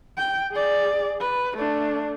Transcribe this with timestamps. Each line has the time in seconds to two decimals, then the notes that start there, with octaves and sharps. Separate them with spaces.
0.18 G5
0.51 G#4 D5
1.21 B4
1.57 A3 D4